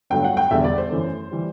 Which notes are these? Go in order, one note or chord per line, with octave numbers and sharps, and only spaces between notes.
G1 G2 F#3 A3 G5
F#5
G5
E1 E2 D3 G3 E5
D5
C5
F#2 E3 A3
E3 G3